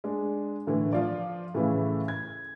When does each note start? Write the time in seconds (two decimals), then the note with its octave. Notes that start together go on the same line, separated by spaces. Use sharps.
0.04 G#3 D4
0.67 A2 D3 E3
0.93 F3 F4 D5
1.55 A2 C#3 E3 E4
2.08 G#6